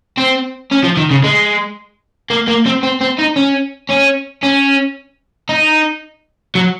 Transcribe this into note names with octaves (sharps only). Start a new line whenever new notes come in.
C4
C#4
F3
D#3
C#3
G#3
A#3
A#3
C4
C4
C4
D#4
C#4
C#4
C#4
D#4
F#3